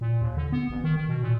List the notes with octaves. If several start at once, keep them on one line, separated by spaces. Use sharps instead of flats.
A#2
D#2
D3
B3
A1
D#3
D#3
B2
A#2